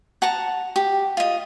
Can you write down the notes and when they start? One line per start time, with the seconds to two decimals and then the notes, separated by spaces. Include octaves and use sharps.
0.22 F#5 A5 A#5
0.76 G4
1.17 F4 D#5